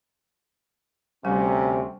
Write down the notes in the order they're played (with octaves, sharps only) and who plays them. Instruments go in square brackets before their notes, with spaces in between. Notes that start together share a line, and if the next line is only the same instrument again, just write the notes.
[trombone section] D2 C3 [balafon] G3 [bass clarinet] C#4